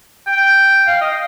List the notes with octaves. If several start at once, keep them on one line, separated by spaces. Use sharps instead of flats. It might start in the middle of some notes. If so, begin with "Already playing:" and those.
G5
F5
D#5